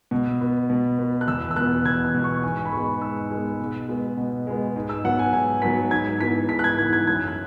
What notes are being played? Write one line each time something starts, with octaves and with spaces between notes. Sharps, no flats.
B2
B3
B2
B3
F#6
E2 E6
E6
B2 B3 F#6
E2 G#6
E6
B2 B3
C#6
G#2 G#5
B5
G#3 B3 C#6
G#2 E6
G#3 B3
B2
G#3 B3
B2
G#3 B3
G#2
E6
F#3 B3 F#5
G#5
G#2 G#5
F#3 B3 B6
G#2 G#6
E3 B3 B6
G#2 B6
F#6
G#6
E3 B3 G#6
G#6
F#2 G#6
F#6